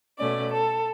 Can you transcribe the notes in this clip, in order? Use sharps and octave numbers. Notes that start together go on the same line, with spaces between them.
B2 A3 C#4 D5
A4